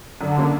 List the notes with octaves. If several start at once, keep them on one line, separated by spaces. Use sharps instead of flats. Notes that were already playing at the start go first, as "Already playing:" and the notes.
F#2 D3
C#3 F#3 A#3